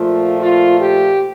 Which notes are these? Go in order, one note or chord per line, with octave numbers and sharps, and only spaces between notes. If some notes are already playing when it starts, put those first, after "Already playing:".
Already playing: A#2 F3 A3 F4
F4
G4